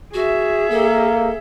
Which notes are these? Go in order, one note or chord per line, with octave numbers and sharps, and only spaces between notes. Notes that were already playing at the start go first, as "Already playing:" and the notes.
F#4 G#4 E5
A#3 A4